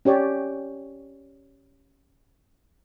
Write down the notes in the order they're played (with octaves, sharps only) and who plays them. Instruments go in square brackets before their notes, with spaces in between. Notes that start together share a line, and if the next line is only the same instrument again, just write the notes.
[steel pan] C#4 G4 C#5 D5